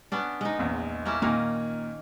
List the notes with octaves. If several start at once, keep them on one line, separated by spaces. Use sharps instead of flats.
B3 C#4 D4
G#3 D#4
A#1 E2
A#3 C#4 E4
A#2 D#3 A#3 G#5 F6